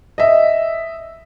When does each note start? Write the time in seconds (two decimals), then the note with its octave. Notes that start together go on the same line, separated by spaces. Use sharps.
0.18 D#5 E5